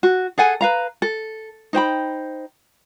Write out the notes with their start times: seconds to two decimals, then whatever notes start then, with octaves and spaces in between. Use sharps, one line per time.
0.03 F#4
0.38 G#4 A4 F#5 G#5
0.61 B4 F5 A#5
1.02 A4
1.73 D#4 C5 G5 B5